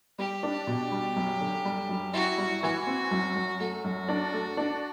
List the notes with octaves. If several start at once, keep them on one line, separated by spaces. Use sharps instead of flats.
G3 G4
D4
B2
G3
F#2
D3
G3
F#2
E4 F#4
G3
E3 F#4
C4
F#2
F#2
A3 F#4
F#2
D4
A3
D4